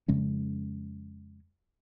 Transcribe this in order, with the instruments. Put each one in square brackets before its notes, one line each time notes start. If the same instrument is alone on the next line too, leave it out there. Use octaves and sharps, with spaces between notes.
[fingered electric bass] F2 C#3 G#3 C#4